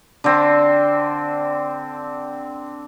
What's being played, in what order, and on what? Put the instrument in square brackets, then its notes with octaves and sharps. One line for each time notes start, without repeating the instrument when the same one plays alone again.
[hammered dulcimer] D3 C4